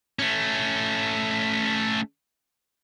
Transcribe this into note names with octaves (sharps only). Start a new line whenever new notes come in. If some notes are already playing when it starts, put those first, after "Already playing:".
A3 C#4